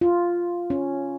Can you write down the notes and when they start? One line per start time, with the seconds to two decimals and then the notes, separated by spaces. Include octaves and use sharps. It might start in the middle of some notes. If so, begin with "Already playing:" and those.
0.01 F4
0.70 C#4